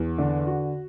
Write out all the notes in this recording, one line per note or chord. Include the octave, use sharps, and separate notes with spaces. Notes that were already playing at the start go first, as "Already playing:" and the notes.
Already playing: E2
D3
F#4